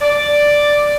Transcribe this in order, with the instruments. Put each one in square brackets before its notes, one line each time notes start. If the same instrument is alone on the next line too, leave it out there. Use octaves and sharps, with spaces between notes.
[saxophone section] D5